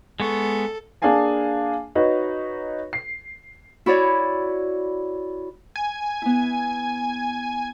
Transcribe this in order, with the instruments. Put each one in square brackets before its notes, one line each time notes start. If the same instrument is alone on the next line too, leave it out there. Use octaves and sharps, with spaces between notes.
[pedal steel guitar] G#3 B3 C#6 [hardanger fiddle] A4
[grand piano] A#3 D4 G#4 F5 G#5 A5
D#4 F#4 B4 C#5 D#5
C7
[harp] E4 F#4 C#5 D5
[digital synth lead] G#5
[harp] B3 E4